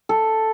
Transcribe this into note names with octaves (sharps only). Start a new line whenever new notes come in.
A4